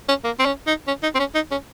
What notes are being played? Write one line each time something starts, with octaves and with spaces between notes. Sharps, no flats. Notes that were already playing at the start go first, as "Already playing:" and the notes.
C#4
A#3
C4
C#4
D#4
C#4
D#4
C4
C#4
D#4
C#4